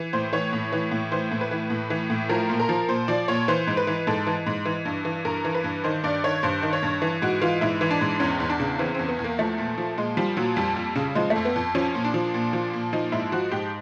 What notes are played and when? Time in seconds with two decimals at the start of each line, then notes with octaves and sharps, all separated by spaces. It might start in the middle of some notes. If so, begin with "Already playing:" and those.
Already playing: E3
0.13 A2 C5
0.33 E3 C#5
0.53 A2
0.72 E3
0.91 A2
1.11 E3 C5
1.31 A2
1.41 B4
1.51 E3
1.70 A2
1.90 E3
2.10 A2
2.29 F3 A#4
2.49 A#2
2.60 A#4
2.69 F3
2.88 A#2 C5
3.08 F3 D5
3.28 A#2 C#5
3.48 E3 C5
3.67 G#2
3.77 B4
3.87 E3
4.07 G#2 A4
4.27 E3
4.46 G#2
4.65 E3
4.85 G2
5.05 E3
5.25 G2 A#4
5.45 E3
5.55 B4
5.64 G2
5.84 D#3 C5
6.04 G2 D5
6.24 D#3 C#5
6.43 G2 C5
6.62 D#3
6.73 C#5
6.83 G2
7.02 E3
7.22 G#2 F#4
7.41 E3 F4
7.61 G#2 E4
7.81 E3
7.90 D4
8.01 G#2
8.20 E2 C#4
8.40 E2
8.49 D4
8.60 C#3
8.79 E3 C4
8.94 E2 C4
9.08 B3
9.19 E2
9.24 A#3
9.39 F3 A3
9.58 A#2
9.78 F3
9.97 A#2 G#3
10.17 F3 G3
10.37 A#2 F#3
10.56 F2 G3
10.76 F2
10.95 C#3
11.15 F3 G#3
11.30 A3
11.36 F2
11.45 B3
11.56 F2
11.75 F3 C#4
11.95 A#2
12.04 D4
12.14 F3
12.34 A#2
12.53 F3
12.73 A#2
12.93 F3 D#4
13.12 G#2 E4
13.32 F3 F#4
13.52 G#2 G4